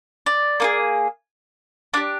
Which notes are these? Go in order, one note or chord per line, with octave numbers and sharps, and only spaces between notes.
D5
A#3 D#4 G#4
D4 G4 D5